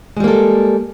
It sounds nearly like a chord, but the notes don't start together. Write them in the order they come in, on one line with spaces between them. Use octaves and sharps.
G#3 G3 A#3 A4